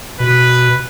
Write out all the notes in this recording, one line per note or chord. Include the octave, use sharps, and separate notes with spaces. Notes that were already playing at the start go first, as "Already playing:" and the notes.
B2 B4